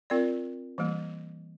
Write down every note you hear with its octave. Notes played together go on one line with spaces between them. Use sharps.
C4 F4 A#4 D5
E3 G3 A#3